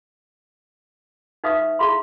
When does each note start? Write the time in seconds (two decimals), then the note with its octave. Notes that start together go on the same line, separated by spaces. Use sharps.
1.44 D#4 B4 E5 F5 C#6 D#6
1.79 E4 G#4 F5 B5 C6